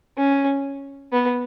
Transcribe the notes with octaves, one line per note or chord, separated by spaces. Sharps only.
C#4
B3